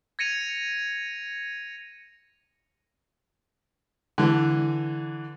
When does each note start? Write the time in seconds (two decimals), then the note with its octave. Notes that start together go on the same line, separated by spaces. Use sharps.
0.19 G#6 A#6 C#7 D#7 F7
4.18 D3 E3